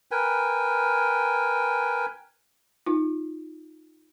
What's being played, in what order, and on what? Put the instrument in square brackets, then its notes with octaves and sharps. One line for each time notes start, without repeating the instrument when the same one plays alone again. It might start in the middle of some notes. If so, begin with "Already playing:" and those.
[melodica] A#4 B4 G5 G#5
[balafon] D#4 F4